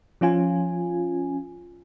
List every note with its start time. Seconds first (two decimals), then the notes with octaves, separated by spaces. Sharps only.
0.21 F3 C#4 F4 G#5